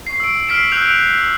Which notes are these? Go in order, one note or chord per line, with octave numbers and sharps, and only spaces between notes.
C#6 C7
E6 D7
F6 B6 C7 D7 E7 F#7
E6 F#6 G6 F7
G6 D7
F#7